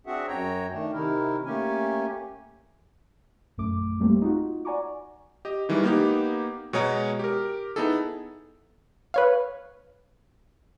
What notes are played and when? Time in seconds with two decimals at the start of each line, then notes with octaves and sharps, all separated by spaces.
0.07 C4 D4 F#4 G#4 E5 F#5
0.28 F#2 F#4 C#5 G5 A#5
0.71 D#3 A3 D4
0.93 C3 D#3 D#4 E4 A#4
1.45 A3 A#3 C#4 G4 G#5
3.58 A#1 F#2 A3 D6
4.00 G3 A3 A#3 C4 G4
4.22 D#4 F4 F#4
4.65 D5 F#5 G#5 A#5 C#6 D6
5.45 G4 D#5
5.69 D#3 E3 G3 G#3
5.84 A#3 B3 D#4 G4
6.73 B2 G#3 C#5 D#5 A#5
7.19 G4 A#4
7.76 B3 D#4 E4 G#4 A4
9.14 B4 C#5 F5